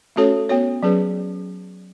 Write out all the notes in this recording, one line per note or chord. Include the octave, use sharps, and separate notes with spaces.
A3 C#4 F#4 A4 C#5
B3 F#4 C#5
F#3 C#4 G#4 B4